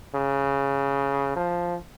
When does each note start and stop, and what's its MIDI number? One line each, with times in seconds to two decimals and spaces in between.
0.15 1.33 49
1.36 1.75 53